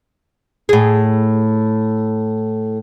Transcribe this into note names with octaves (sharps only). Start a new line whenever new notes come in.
A2 G#4